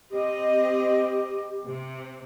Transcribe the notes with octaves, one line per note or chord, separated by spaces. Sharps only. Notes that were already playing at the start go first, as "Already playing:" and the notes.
C4 G4 D#5
C3